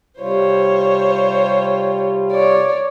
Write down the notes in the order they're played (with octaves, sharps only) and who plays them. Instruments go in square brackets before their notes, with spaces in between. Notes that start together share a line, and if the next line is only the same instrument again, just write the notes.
[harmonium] C3 G3 F4 [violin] C5 C#5
[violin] C#5 D5